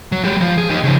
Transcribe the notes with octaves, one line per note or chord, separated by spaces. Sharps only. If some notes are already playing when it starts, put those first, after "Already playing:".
F#3
G#3 G4
F3
G#4
D#4 G4
C#3 F3